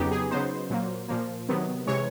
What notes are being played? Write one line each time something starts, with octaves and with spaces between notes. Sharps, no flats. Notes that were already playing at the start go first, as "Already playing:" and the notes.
Already playing: F2 C#3 F#3 B3 D#4 G4
G#4
C#3 F#3 B3 D#4 C5
A#2 F#3 A#3
A#2 F3 A#3
C3 D#3 F#3 B3
C3 E3 G#3 C#5